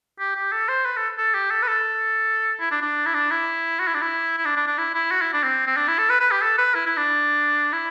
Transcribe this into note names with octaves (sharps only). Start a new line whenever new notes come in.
G4
G4
A4
C5
B4
A4
A4
G4
A4
B4
A4
E4
D4
D4
E4
D4
E4
F#4
E4
D4
E4
E4
D4
D4
D4
E4
E4
F#4
E4
D4
C4
C4
D4
E4
A4
B4
B4
G4
A4
B4
E4
E4
D4
E4